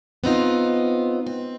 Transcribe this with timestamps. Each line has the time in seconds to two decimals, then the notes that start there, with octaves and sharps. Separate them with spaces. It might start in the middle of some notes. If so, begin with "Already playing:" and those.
0.24 B3 C4 D#4 F4
1.27 C4